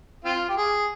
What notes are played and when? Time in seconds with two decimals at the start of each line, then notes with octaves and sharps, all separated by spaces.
0.25 C4 F4
0.49 G4
0.57 G#4